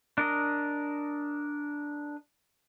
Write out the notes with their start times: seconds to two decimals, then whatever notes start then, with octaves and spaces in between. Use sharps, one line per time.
0.18 D4 A#4 D#5